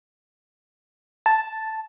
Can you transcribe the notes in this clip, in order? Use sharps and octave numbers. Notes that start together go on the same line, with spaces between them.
A5